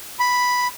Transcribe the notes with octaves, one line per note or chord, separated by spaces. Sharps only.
B5